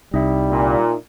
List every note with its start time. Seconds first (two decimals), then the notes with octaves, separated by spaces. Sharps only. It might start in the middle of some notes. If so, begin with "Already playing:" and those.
0.14 C2 G3 D#4 E5
0.50 A#2